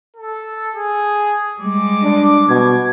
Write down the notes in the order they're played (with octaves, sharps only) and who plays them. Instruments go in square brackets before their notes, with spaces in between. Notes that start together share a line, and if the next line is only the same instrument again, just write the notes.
[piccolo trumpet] A4
G#4
[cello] G3 G#3 [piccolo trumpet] D6
[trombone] D4
[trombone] B2 [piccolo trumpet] G#6